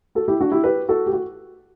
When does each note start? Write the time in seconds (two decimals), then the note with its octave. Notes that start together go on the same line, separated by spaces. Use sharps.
0.15 F#4 A4
0.28 E4 G4
0.41 D4 F#4
0.52 E4 G4
0.64 G4 B4
0.89 F#4 A4
1.06 G4
1.13 F#4